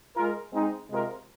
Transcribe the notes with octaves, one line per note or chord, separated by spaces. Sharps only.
G#3 F4 A#4
G#3 C4 D#4
C3 G#3 F4 A#4